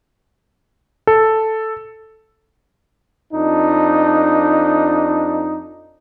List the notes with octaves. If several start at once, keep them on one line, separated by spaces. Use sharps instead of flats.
A4
F2 D4 D#4